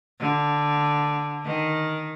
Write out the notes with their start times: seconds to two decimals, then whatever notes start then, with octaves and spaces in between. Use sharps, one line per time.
0.20 D3
1.44 D#3